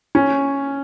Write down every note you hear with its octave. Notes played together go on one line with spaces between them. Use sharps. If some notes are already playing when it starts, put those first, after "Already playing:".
C#4